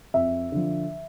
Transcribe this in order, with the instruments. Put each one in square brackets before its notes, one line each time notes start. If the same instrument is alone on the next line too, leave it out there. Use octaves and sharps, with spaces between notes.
[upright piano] F2 E5
D3 F3